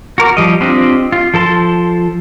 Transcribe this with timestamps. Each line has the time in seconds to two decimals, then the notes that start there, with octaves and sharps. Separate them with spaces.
0.18 F#4 A#4 D6
0.37 F3 G3 D#5
0.61 C4 D4 F4 G4 D#5
1.12 F4
1.34 F3 A4 A5 C6